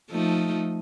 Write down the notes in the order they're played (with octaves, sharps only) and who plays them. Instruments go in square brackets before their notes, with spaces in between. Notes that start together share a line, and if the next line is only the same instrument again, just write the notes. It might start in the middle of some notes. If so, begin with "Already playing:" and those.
[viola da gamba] F3 A3 D#4